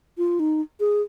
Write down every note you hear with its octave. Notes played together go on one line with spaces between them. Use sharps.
F4
D#4
G#4